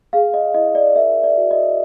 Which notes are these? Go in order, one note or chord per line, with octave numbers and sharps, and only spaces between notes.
G#4 F5
D#5
E4 D#5
D5
A#4 E5
D5
F#4
D#5